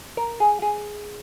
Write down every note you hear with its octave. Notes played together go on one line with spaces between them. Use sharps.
A#4
G#4
G#4